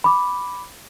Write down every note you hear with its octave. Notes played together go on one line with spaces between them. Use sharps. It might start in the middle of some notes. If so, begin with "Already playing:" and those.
B5 D6